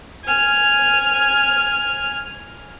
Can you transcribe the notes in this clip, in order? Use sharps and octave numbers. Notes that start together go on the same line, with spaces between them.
G#5 F6